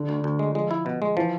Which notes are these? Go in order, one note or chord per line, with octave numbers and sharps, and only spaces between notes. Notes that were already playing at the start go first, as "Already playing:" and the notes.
Already playing: D3
D2
D2
G#3
F3 G#3
E4
B2
G#3
E3 F3